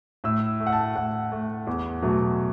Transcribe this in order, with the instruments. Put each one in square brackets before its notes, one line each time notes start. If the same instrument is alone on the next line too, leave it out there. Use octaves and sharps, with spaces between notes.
[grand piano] A2 E6
A3
F#5
A5
A2 F#5
A3
E2
B2 F#3 A3